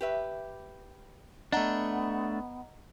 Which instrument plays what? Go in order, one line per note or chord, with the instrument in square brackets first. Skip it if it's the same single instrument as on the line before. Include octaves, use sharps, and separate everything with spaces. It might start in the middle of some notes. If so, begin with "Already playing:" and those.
[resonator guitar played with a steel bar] G4 B4 E5
[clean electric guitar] A3 D4 [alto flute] B3 [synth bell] D#5 F#5 A#5